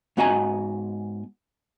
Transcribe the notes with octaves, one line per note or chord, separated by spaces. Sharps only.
G#2 B3 F#4 D#5 G#5 A#5